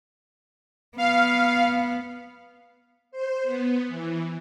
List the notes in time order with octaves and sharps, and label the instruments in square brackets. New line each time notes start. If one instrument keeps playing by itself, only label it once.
[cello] B3 [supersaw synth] F5
[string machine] C5
B3
E3